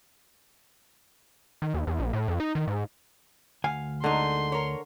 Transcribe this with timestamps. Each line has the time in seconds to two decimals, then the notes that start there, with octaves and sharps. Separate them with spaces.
1.62 D#3
1.74 D#2
1.87 E2
1.99 A#1
2.13 A2
2.28 F2
2.40 D#4
2.55 D#3
2.68 G#2
3.64 D2 F5 F#5 G#5
4.04 D3 G#3 A#3 D#4 C6
4.52 A#4 C#5